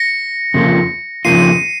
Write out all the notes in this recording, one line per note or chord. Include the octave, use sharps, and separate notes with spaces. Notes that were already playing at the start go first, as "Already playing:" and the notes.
Already playing: A#6 C#7
F2 C#3 F3 A#3 F4
F2 C#3 F3 A#3 F4 C7 D#7